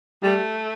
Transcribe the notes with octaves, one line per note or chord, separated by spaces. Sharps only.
G3 A3